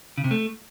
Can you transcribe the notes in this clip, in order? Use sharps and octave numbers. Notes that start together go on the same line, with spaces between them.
C#3
C3
A3